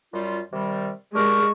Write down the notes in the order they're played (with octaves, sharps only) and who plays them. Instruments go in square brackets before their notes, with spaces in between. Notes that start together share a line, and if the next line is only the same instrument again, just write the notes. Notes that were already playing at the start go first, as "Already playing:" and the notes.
[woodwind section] F#2 G3 F4
C3 D#3 G3
[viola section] G#3 [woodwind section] D4 G4 A#4 [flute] C#6